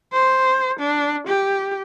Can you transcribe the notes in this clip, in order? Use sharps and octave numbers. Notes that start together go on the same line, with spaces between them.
C5
D4
G4